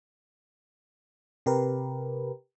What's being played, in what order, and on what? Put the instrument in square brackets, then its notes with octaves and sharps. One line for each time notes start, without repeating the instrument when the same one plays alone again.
[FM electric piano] C3 G4 A#4 B4